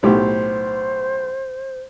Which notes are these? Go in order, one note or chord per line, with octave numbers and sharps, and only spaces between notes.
B1 A2 G4 C5